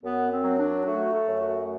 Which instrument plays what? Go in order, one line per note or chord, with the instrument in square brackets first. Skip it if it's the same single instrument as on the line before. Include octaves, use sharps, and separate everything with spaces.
[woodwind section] F#2 B3
C4
F#3
D4
A3 F#4
A4
F#2
F#4